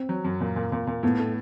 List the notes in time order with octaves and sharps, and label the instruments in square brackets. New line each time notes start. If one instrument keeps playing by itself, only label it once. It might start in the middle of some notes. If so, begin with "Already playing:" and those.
Already playing: [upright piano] C4
[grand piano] F#3
F#2
A#2
A#2
A#2
A#2
[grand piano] A2 [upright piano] B3
[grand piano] A3